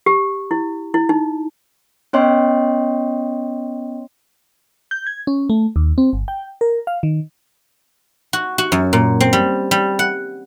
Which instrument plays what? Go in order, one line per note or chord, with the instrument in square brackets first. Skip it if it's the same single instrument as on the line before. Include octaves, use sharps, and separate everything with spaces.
[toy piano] G4
E4
E4
D#4
[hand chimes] B3 C#4 C#5 D#5 G5 C6
[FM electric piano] G6
G#6
C#4
A3
D#2
C4
G1
G5
A#4
F5
D#3
[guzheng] F#4
F#4
F#2
A#2
C4
G3
G3
F#5